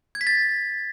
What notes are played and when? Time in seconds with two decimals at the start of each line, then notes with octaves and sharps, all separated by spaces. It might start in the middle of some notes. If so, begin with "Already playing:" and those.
0.15 G#6
0.21 B6
0.27 A6